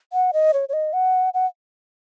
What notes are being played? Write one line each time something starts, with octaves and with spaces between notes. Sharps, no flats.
F#5
D#5
C#5
C#5
D#5
F#5
F#5